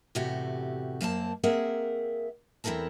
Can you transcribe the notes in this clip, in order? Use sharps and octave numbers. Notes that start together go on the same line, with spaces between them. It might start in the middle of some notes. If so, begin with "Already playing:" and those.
E2 A2 C3 A3 F#4 G4
F#2 A#3 C4 A5
A#3 C4 G#4 A#4 E5 F#5
E2 C4 E4 A4 A#4 A5